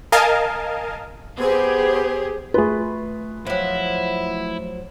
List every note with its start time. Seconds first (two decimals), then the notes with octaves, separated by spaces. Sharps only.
0.12 A#4 D#5 F5 G#5 A5
1.39 B3 G4 G#4 C5
2.54 A3 F4 G#4 B4
3.46 F3 F#3 E4